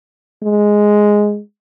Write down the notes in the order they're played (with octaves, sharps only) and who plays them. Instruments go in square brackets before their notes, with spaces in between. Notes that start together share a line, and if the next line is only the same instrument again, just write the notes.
[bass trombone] G#3